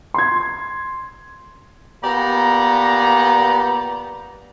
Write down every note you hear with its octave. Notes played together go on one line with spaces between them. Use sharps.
C6 G#6
A#2 B3 G4 D5 A#5